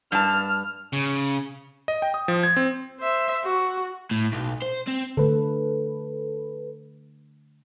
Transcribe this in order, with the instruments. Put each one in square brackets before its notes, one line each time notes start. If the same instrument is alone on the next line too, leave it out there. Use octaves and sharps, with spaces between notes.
[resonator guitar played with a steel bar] G2 A5 [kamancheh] F6
[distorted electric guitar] C#3
[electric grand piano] D#5
G5
D#6
F3
G#6
C4
[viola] C5 E5
F#4
[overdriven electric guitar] A2
B1
C5
C4
[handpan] D3 A3 [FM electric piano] A4 B4